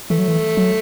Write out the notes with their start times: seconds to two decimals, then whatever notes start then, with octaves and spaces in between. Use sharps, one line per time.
0.10 E3 A3
0.19 F#3
0.28 E3
0.57 F#3